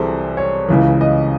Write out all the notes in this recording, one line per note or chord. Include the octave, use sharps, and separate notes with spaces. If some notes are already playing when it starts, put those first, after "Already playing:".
Already playing: C2 C3 E3 G#4 A4 C5
C#5
C#2 C#3 E3
D#5